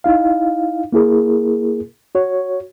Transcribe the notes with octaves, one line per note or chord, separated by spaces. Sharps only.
D#4 E4 F5
A#3 E4 G#4 A#4
F#4 C#5